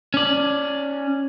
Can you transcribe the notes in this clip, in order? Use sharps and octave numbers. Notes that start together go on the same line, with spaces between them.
C#4 D5